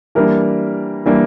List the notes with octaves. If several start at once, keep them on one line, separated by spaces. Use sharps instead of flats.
E3 G3 A#3 D4 A#4
E3 G3 A#3 D4